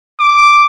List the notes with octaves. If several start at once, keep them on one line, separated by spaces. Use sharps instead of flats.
D6